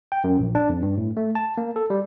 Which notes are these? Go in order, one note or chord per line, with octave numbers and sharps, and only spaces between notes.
G5
F#2
A#1
D4
F2
G2
A2
A3
A5
A#3
A4
G3